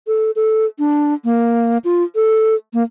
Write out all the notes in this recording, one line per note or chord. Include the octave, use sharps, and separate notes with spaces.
A4
A4
D4
A#3
F4
A4
A#3